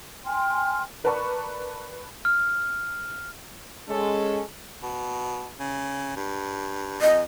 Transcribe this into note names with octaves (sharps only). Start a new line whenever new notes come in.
G5 G#5 C6 F6
A#4 B4 D5 A5 B5 C#6
F6
G#3 C#4 A4
B2
C#3
G2
F2 D#5